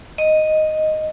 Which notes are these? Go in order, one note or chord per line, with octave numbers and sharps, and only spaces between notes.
D#5